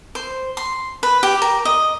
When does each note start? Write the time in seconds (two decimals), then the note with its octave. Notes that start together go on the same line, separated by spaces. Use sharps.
0.15 C5
0.57 C6
1.03 B4
1.23 G4
1.42 A#4
1.65 D#5